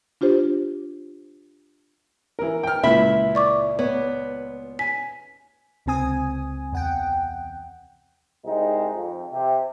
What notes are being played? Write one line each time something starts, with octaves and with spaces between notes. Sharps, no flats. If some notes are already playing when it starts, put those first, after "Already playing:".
D4 F4 G4 C5
E3 A#4
G5 F6
C#2 A#2 E4 E5 B5
D5 C#6 D6
B3 C#5
G#5 B6
C#2 C3 C4 G#5 D#6
E2 F#5 G5
C2 G#3 D#4
F2
C3